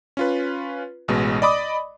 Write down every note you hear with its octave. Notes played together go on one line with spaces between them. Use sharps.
C#4 F4 B4
A1 B2 G#3
D5 D#5 B5 D6 D#6